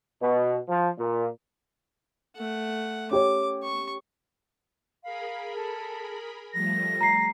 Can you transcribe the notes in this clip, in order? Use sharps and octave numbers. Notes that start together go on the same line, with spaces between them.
B2
F3
A#2
A3 F#5
C#4 G4 C#5 D6
C#6
G#4 A#4 F5 B5
A4
F3 G3 A3 A#6
A#5 C7